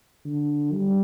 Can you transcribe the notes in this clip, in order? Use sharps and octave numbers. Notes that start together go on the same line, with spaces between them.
D3
G3